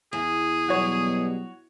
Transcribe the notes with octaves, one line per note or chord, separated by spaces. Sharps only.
E2 G#4
B2 F#3 G3 F#4 C#5